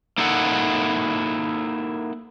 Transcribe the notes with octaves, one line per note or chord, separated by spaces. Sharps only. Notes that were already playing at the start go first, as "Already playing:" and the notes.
A#3 D#4 E4 A4 F#5